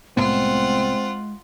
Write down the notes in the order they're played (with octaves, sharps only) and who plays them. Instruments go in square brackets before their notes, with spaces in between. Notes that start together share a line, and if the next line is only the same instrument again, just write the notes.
[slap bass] C2 A2 B3 [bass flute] G#3 [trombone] C4 [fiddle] F4 F#5